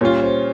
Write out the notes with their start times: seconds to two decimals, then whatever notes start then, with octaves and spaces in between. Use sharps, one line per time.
0.01 A#2 G3 C#4 F4 C#5
0.23 C5